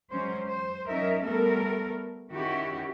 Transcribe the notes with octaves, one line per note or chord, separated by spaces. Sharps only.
F#3 G#3 C#4 C5
C5
F#3 C#4 D#4 A#4 E5
G3 A3 B3 A4 A#4
D#3 C#4 E4 F#4 G4